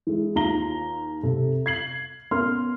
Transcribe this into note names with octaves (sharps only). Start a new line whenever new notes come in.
E3 G#3
D#2 F4 A#5 G7
C3 A4
G#6 C7 F#7
B3 C#4 A#4 C6 F6